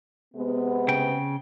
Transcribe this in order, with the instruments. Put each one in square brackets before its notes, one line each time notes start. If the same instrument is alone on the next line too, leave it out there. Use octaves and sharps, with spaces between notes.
[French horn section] C3 G#3 B3
[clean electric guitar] C#3 G5